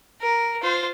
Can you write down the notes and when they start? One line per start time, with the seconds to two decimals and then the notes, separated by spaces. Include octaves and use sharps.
0.21 A#4
0.62 F4 C5